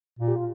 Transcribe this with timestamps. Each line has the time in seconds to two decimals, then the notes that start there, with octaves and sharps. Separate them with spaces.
0.19 A#2 F4
0.28 G4
0.36 F4